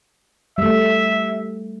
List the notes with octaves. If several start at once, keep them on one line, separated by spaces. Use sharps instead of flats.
G3 A3 E5